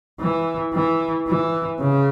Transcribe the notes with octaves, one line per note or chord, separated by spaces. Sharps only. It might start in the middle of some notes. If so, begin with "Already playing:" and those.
E3
E3
E3
C#3